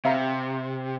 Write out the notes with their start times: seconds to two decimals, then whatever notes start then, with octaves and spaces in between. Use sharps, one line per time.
0.05 C3 E5 F5 A#5